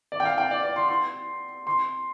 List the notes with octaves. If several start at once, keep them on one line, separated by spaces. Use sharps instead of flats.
D5
G5
F5
G5
D5
D5
C6
C6
C6